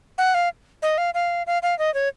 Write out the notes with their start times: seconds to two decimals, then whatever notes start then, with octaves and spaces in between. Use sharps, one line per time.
0.18 F#5
0.34 F5
0.82 D#5
0.98 F5
1.14 F5
1.47 F5
1.63 F5
1.79 D#5
1.94 C#5